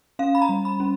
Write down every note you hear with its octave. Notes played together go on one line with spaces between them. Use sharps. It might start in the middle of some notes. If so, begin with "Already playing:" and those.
C#4 F5
B5
A#5
G3
B5
C#4